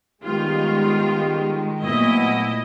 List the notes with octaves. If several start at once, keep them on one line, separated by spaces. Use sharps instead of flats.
D#3 G3 G#3 B3 D#4 F4 G4
A#2 F3 F#3 A3 B3 E4 D#5